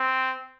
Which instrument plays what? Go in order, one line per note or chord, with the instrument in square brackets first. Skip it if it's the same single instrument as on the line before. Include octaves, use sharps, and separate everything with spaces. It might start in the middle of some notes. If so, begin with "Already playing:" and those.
Already playing: [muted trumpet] C4